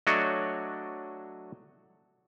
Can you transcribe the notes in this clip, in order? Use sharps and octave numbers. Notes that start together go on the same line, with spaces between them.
F#3 A3 D4 F#4 C#5 D#5